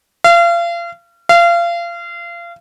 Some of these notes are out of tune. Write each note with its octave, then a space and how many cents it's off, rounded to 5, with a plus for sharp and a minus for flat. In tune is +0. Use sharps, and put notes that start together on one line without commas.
F5 -35
F5 -30